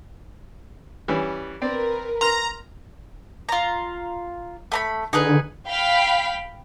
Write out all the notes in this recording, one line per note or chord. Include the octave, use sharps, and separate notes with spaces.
E3 G3 C#4
C4 A#4 B4 D5
A#5 C6 F6
F4 A#5
A3 A#5 B5
D3 D#4 G#4 B4
F5 G5 B5 B6